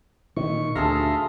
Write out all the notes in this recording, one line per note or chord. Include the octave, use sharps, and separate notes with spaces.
A#2 D#3 C#6
D2 G#4 A4 E5 F5 A#5 C6